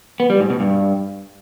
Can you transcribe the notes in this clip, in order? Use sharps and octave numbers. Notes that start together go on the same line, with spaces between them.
B3
G3
G#2
B2
G2